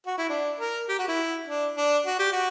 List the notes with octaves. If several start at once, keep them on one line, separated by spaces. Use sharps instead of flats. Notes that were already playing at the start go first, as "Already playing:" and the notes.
F#4
E4
D4
A#4
G4
F#4
E4
D4
D4
F#4
G4
F#4